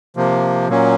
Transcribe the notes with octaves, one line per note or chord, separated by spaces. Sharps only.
C3 F3 A#3
A#2 F#3 A#3 C#4